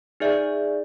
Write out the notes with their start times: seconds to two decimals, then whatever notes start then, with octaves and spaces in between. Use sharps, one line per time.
0.20 D#4 G#4 D5 E5